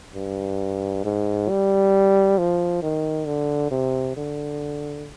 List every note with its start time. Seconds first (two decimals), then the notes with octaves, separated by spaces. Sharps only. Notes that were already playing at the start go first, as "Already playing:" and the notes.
0.15 G2
1.05 G#2
1.49 G3
2.38 F3
2.82 D#3
3.27 D3
3.71 C3
4.17 D3